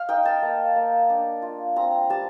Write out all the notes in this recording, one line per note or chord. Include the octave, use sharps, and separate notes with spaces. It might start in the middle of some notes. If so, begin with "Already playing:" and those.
Already playing: F5
D#4 G5
A5
A#3
A#3
D4
F4
C4 A#5
G3 A5